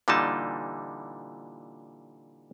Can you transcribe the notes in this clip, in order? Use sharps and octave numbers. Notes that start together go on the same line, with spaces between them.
A#2 D3 E3 G3 D#4 A5